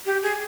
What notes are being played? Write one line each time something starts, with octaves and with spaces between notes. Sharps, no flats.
G4
G#4